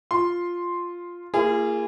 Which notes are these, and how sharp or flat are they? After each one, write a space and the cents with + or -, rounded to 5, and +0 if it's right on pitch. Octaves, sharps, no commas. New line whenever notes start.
F4 +0 C6 +0
A#3 -15 F4 -45 G#4 -15